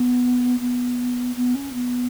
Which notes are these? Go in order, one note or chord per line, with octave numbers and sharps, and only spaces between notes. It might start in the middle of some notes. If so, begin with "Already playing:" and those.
Already playing: B3
B3
B3
C#4
B3